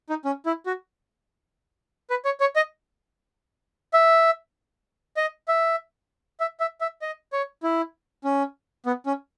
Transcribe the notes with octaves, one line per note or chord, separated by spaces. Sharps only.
D#4
C#4
E4
F#4
B4
C#5
C#5
D#5
E5
D#5
E5
E5
E5
E5
D#5
C#5
E4
C#4
B3
C#4